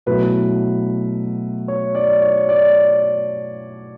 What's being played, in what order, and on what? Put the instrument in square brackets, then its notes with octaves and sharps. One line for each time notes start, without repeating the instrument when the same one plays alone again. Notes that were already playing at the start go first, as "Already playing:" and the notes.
[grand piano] B2 F#3 A3 E4 B4
C#5
D5
C#5
D5